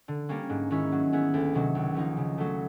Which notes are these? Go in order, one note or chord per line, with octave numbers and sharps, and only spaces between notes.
D3
G3 A#3 C#4
G#2
D#3 G#3 C#4 E4
F#3
B3 E4 G#4
D2
C3 D#3 F#3
C#2
C#3 F3 A#3 D#4
C#3
F#3 A3